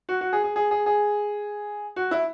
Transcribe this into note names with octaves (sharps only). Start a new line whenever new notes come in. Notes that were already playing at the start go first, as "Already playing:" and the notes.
F#4
F#4
G#4
G#4
G#4
G#4
G#4
F#4
E4